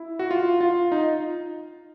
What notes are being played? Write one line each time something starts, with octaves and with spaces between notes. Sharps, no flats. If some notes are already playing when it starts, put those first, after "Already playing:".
Already playing: E4
F#4
F4
F4
D#4